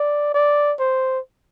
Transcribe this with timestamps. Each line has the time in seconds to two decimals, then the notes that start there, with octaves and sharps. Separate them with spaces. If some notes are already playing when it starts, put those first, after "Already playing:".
Already playing: D5
0.34 D5
0.79 C5